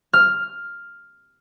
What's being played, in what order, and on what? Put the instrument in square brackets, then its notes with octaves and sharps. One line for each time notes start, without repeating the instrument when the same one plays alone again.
[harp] F6